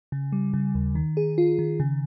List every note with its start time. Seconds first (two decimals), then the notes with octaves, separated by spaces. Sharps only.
0.12 C#3
0.32 G3
0.54 C#3
0.75 D#2
0.95 D#3
1.17 G#4
1.38 F4
1.59 D#3
1.80 C#3